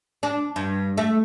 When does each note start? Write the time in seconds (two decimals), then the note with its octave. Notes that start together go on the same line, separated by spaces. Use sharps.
0.23 D4
0.56 G2
0.98 A3